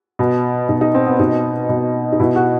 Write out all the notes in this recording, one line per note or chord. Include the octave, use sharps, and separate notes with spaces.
B2
B2 D#4
D#4
C4
B3
B2 D#4
B2
D#4
B2 E4
F#4